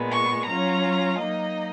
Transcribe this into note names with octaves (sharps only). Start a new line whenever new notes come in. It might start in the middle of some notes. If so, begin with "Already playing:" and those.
Already playing: A#2 G#3 B3
C#6
F#3 C#4 F4 A#5
F#3 A#3 D#4 D#5